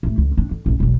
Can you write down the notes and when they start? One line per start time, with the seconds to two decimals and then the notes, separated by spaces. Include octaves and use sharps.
0.03 A1 A3
0.18 C#2
0.37 C4 D4
0.51 D3
0.66 A#1 C#4
0.80 E1 B1